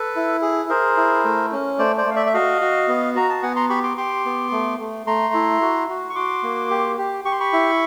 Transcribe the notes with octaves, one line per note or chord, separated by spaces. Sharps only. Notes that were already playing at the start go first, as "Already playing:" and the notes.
Already playing: A4 B4
E4
G#4
G#4 A#4 C5
E4
A3
C#4
A3 C5 D5
C5 D5
A3 F5
D5 E5
E5
F#4 D#5 F5
F#4
B3
F#4 A#5
A5
B3 F#5 G#5
A#5 C6
G4 B5 C#6
C6 D6
G4 C6 D6
B3
A3
A3
A3 A#5 C6
E4
F#4
F#4
C#6
F#4 C6 D6
A#3
G4
G4
G4 C#6
C6
B5 C#6
E4